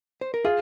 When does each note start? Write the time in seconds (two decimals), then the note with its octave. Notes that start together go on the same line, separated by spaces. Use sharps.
0.21 C5
0.34 A#4
0.45 F4 G#4